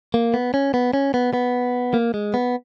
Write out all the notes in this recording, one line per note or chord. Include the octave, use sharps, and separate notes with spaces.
A#3
B3
C#4
B3
C#4
B3
B3
A#3
G#3
B3